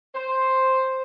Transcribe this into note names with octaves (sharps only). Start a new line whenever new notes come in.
C5